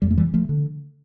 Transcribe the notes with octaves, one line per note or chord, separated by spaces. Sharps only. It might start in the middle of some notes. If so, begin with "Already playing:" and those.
F2 G3
A3
E3 G3
F3 A3
D3